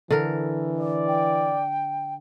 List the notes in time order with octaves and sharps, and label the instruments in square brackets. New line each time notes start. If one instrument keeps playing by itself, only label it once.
[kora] D3 A#4 [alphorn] E3
[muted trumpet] D5
[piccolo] G5